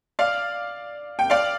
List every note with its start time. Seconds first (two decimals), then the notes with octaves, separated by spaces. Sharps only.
0.19 D5 F5
1.19 G5
1.30 D5 F5